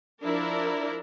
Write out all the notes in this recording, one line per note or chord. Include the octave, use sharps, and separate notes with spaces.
F3 D4 E4 A#4 D5